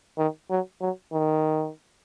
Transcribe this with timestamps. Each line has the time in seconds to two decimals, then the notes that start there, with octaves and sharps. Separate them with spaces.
0.18 D#3
0.50 F#3
0.81 F#3
1.13 D#3